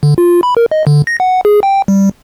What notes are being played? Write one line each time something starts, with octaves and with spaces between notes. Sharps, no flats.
D3
F4
B5
A#4
D#5
D3
A#6
F#5
G#4
G5
G3